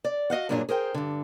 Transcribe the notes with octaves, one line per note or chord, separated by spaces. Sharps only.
D5
F#4 D#5 F5 F#5
G2 A#2 F#3 D4 F4 G#4
G#4 A#4 C5 G5
G2 D3